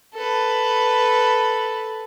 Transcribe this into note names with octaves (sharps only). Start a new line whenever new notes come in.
A4 B4